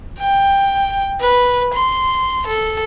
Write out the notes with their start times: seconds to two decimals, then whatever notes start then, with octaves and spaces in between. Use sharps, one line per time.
0.19 G5
1.20 B4
1.74 C6
2.46 A4